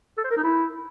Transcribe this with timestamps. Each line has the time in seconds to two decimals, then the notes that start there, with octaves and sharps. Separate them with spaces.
0.18 A4
0.24 C5
0.31 A#4
0.37 D#4
0.44 E4